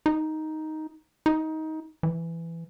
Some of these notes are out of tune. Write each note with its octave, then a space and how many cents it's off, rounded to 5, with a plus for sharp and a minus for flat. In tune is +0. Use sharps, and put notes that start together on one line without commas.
D#4 +5
D#4 +20
E3 +15